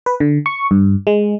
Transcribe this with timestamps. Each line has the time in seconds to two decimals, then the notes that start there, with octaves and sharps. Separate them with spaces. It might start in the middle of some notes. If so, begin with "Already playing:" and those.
0.06 B4
0.20 D3
0.46 C#6
0.71 G2
1.07 G#3